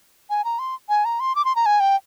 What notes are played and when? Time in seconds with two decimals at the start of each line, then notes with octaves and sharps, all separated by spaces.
0.30 G#5
0.45 A#5
0.59 C6
0.89 G#5
1.05 A#5
1.20 C6
1.35 D6
1.45 C6
1.56 A#5
1.66 G#5
1.80 G5